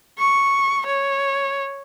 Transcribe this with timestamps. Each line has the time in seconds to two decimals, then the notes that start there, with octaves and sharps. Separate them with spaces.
0.18 C#6
0.86 C#5